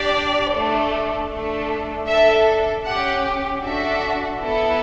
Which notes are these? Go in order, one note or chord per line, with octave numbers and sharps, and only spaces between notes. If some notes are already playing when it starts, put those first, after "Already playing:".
Already playing: D4 G4 D5
A3 D4 A4
A3 D4 A4
D4 A4 E5
C#4 G4 F#5
D4 F#4 A4 E5
B3 E4 A4